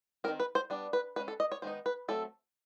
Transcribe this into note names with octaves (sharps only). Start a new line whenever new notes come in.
D#3 G3 C4 A#4
B4
C5
G3 B3 D4
B4
G#3 C#4 B4
A4
D#5
C#5
D#3 G#3 B3 D#4 C5
B4
F#3 A3 C4 A4